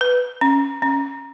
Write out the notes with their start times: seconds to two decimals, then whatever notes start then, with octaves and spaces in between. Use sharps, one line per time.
0.01 B4
0.41 C#4
0.82 C#4